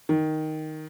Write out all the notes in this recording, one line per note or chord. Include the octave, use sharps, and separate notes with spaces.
D#3